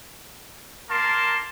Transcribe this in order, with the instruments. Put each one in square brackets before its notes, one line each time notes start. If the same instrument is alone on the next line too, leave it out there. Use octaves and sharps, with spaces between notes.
[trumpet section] A#3 A#4 A5 C6